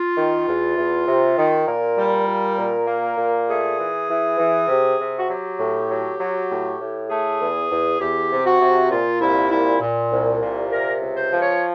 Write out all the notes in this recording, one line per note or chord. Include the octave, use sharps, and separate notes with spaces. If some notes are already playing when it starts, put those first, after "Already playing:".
Already playing: F4
D#3
E2
E2
C3
D#3
A#2 A#4
G3
A#2
A#2
A#3
A#2
A3 G#4
E3
E3
E3
C3
C3
F#4
F#3 G4
A2
F#3
F#3
A2
A2
A3 G#4
E2
E2
E2 G4
C3
F#4
C3
A#2 F4
C2 E4
A#2 E4
A#2
C2
A#2
C3 A#4
C#2
C5
F3
C#5